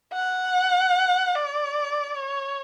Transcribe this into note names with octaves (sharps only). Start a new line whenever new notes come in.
F#5
D5
C#5